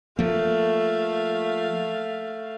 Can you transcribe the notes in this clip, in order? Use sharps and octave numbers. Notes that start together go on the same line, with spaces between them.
F3 A3 A#3 F5